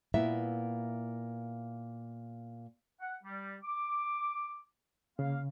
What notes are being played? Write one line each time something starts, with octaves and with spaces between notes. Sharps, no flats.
A#2 A#3 B3 E4 E5
F#5
G3
D6
C#3 A#3 F5